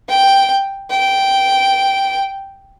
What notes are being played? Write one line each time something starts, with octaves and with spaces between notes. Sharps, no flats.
G5
G5